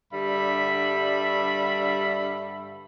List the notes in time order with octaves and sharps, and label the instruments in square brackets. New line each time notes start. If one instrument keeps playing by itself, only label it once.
[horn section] G2 D3 G3 E5 B5